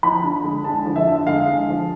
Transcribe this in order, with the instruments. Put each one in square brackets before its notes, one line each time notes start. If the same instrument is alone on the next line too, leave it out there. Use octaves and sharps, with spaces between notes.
[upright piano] F3 B5
D3
G#3
D3 A5
F3
E5
D3
G#3 F5
D3
F3